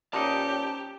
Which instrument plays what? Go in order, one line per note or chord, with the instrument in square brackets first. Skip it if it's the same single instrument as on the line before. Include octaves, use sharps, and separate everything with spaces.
[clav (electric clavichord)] A#2 D#4 [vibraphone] C#4 C5 C#5 [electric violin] G4 [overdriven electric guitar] A5